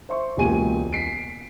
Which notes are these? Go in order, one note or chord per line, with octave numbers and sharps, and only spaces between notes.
C5 E5 C6 C#6
E1 C#2 A#3 G4 G#5 D#7
B6 C7 D7